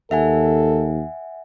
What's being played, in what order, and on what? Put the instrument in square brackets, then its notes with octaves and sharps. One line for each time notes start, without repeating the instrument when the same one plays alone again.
[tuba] D#2 [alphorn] A4 [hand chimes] E5 F#5 G#5